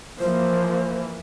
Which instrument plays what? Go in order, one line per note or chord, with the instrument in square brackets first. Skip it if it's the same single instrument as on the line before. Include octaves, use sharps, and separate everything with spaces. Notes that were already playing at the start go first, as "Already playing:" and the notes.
[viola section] E3 A#3 [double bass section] F3 [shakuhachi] C5